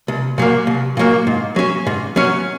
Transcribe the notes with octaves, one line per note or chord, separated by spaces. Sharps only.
C2
A#2 F#3 A#3
C2
A#2 F#3 A#3
G#2
F#3 C#4
G#2
F#3 C#4